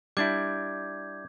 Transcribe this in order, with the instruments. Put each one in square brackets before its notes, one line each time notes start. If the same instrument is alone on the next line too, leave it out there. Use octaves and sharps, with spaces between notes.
[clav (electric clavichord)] G3 D4 E4 [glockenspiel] D6 G6 G#6